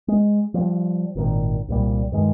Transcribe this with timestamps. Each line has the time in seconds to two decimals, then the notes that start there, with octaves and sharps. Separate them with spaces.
0.08 G#3
0.54 F3 G3
1.15 G#1 A#2 D#3
1.68 C2 A#2 G3
2.12 G2 D#3 G#3